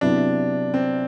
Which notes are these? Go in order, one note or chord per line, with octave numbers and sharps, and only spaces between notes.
C3 F#3 B3 D4 E4
C4